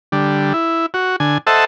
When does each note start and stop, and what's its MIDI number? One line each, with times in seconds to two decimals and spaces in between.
0.12 0.53 50
0.12 0.53 55
0.54 0.86 64
0.94 1.16 66
1.20 1.38 50
1.20 1.38 80
1.47 1.65 69
1.47 1.65 72
1.47 1.65 75
1.47 1.65 76
1.47 1.65 78
1.47 1.65 81